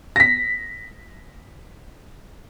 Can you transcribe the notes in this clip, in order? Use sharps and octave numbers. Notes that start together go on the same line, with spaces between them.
A#6 B6